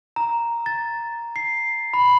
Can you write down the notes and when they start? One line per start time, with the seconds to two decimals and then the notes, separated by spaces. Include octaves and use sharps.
0.16 A#5
0.66 A6
1.36 C7
1.94 B5